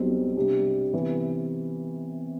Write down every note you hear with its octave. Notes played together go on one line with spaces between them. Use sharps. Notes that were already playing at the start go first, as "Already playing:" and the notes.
Already playing: B1 B2 G3 C4
C3 G3 D4
C3 E3 B3